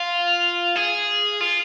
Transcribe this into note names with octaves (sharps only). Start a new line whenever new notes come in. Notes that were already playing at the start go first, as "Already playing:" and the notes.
Already playing: F4
G#4
F4